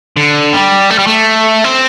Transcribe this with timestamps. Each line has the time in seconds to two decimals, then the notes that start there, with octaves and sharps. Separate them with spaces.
0.17 D3
0.53 G3
0.90 A3
0.99 G3
1.07 A3
1.64 C4